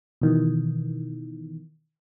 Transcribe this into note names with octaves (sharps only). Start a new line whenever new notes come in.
B2 D#3 E3